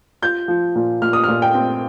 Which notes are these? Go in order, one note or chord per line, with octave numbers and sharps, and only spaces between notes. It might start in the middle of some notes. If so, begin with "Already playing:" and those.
F4 G6
F3
A#2
A#2 F6
D#6
A#2 F6
G5
C4